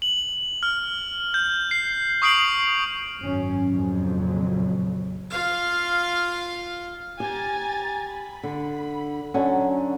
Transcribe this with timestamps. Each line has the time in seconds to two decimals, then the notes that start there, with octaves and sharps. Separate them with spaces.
0.02 F#7
0.63 F6
1.34 G6
1.71 C7
2.22 C#6 D#6 C7 D7 F#7
3.19 G#1 F#2 C#4
3.70 F#1 F2 A#2 C#3 F#3
5.30 F4 F5
7.20 G4 G#5 A#5 A6
8.13 B5
8.43 D3
9.34 D3 F#3 C#4